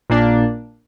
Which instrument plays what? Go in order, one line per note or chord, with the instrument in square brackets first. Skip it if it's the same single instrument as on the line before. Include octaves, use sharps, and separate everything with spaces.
[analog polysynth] A#1 A#2 A#3 D4